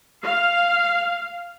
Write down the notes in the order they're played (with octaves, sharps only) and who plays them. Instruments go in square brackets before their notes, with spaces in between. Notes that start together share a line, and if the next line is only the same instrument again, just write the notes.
[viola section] F5